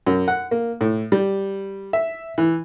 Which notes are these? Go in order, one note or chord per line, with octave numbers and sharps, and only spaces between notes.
F#2
F#5
A#3
A2
G3
E5
E3